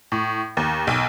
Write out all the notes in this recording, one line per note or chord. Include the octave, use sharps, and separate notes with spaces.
A2
D#2
B1